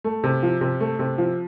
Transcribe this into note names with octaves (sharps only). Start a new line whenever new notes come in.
A3
C3
F3
C3
A3
C3
F3